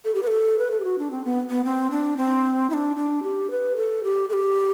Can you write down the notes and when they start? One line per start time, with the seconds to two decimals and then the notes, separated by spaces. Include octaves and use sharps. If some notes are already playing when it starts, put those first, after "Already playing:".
0.05 A4
0.15 G4
0.23 B4
0.27 A4
0.59 B4
0.71 A4
0.80 G4
0.84 F#4
0.99 D4
1.11 C4
1.25 B3
1.50 B3
1.65 C4
1.91 D4
2.17 C4
2.70 E4
2.73 D4
2.96 D4
3.23 G4
3.51 B4
3.76 A4
4.03 G4
4.29 A4
4.33 G4